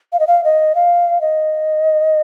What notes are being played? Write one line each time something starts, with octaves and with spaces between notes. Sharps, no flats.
F5
D#5
F5
D#5
F5
D#5